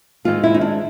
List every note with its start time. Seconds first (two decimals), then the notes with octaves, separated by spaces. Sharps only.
0.25 G#2 D#3 G#3 C4 F4
0.44 E4
0.54 D#4
0.61 D4